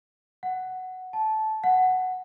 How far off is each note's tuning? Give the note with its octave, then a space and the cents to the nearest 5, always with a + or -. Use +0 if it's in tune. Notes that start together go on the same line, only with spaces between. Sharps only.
F#5 +5
A5 -15
F#5 +0